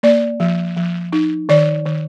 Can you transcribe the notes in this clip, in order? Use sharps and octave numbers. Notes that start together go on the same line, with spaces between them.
A#3 D5
F3
F3
D#4
D#3 D5
D#3